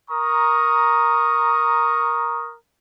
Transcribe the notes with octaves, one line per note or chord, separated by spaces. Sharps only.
A#4 A#5 C#6 D#6